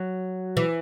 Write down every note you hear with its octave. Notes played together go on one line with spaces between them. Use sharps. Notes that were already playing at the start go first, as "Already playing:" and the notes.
Already playing: F#3
E3